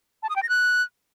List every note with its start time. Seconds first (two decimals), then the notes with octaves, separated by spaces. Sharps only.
0.23 A5
0.29 D#6
0.36 G5
0.43 A#6
0.49 F#6